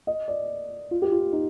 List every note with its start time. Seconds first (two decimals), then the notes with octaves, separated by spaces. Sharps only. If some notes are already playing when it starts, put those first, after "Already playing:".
0.07 D#5
0.28 D5
0.91 F4
1.02 G4
1.12 F4
1.33 D#4